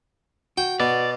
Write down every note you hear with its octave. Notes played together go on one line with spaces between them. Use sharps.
F#4 G5
B2 D5